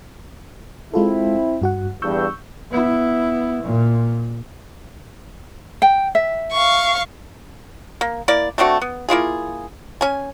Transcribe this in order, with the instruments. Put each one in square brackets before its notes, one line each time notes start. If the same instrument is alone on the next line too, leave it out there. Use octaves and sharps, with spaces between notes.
[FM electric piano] G#3 F4 A4 [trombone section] C4 E4
[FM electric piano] G2 F#4 F#5
[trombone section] E2 G2 [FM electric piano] C#6 E6 G6
[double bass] B3 E4
A#2
[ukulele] G5
E5
[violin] F5 C#6
[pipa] A#3
A#3 E4 D5
A3 C4 D4 F#4
B3
A#3 E4 F4 G#4
C#4 G#5